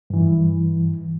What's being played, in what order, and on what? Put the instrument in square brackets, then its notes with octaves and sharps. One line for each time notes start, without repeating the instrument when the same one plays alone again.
[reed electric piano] G2 E3